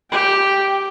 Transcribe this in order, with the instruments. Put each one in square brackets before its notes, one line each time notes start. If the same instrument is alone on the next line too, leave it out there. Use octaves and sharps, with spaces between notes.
[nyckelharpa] G4 [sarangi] G5